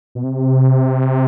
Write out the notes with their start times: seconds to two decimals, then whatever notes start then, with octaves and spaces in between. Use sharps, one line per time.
0.15 B2
0.24 C3